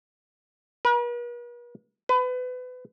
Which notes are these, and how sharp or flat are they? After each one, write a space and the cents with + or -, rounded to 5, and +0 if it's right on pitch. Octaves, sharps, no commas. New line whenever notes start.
B4 -45
B4 +30